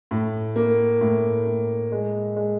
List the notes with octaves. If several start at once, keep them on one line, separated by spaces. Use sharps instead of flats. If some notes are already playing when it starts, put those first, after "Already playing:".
A2
A#3
A2
A2
G#3
G#3